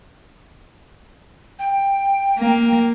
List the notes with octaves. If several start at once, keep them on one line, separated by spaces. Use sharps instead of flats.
G5
A#3